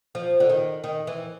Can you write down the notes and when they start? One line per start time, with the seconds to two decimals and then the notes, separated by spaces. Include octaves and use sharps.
0.15 F3
0.40 D3
0.49 D#3
0.84 D#3
1.07 E3